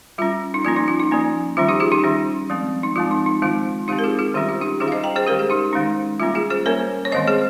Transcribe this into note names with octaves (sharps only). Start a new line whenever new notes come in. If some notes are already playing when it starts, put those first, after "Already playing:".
G3 C#4 F4
D#4
F3 A#3 C#4 F4
D#4
F4
D#4
F3 A#3 C#4
D#3 G3 C#4 F4
D#4 G4
F4 G#4
D#4 G4
D#3 G3 C#4
F3 G#3 C4
D#4
F3 G#3 C4 F4
D#4
D#4
D#3 G#3 C4 F4
D#3 G#3 C4 D#4 G4
A#4
F4 G#4
F4 G#4
D#3 G3 C#4 G4
F4
D#4 G4
D#3 G3 C#4 F4 G#4
F5
C5 D#5
G5 A#5
G#4 C5
D#3 G#3 C#4 G4 A#4
G#4
D#4 G4
D#3 G#3 C#4 D#4
G3 A#3 C#4 F4
F4 G#4
G#4 C5
G3 A#3 C#4 A#4 C#5
C#5
D#3 G#3 C4 C5 D#5
G#4 C5